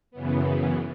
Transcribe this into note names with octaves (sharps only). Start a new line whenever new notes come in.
F#2 C#3 E3 B3